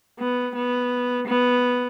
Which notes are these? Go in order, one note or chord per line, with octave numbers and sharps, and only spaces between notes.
B3
B3
B3